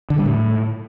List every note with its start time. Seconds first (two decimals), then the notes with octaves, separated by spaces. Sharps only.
0.10 D3
0.18 G3
0.26 A2